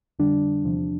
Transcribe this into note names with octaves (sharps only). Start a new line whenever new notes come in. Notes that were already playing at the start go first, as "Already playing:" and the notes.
F2 D3 G3 D4
E2 C3 F3